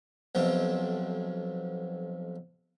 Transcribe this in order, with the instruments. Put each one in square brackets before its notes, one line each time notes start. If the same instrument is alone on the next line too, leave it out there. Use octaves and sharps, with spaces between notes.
[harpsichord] B1 F2 C3